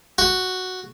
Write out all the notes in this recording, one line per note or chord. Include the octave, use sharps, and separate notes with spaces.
F#4